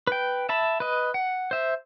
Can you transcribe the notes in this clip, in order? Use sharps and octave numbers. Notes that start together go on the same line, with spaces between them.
B4 G5
E5 A5 B5
B4 D#5
F#5
C5 E5